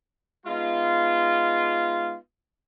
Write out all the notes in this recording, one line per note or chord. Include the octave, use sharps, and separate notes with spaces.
G#3 B3 D#4 F4